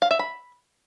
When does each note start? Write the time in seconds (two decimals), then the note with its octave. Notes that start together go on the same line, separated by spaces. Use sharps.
0.02 F5
0.11 E5
0.19 B5